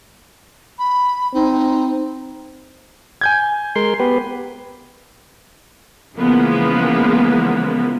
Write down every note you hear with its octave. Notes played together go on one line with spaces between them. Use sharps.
B5
C4 D#4
G#5 G6 G#6
G#3 A#4 C6
B3 G4 B4
C#3 E3 F3 G#3 A#3 B3